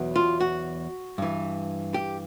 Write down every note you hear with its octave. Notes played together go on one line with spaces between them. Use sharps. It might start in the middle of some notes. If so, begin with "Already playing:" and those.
Already playing: E2 B2 F#3
F4
F#4
G2 E3
G4